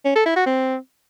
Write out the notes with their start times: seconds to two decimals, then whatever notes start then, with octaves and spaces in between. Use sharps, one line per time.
0.05 C#4
0.15 A4
0.26 E4
0.36 F#4
0.46 C4